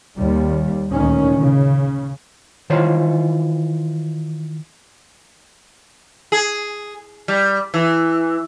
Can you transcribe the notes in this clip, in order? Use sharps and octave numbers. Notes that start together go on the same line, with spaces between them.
D#2 G3
D2 A#2 D#3 C#4
C#3
D#3 E3 F4 C5 C#5
G#4
G3
E3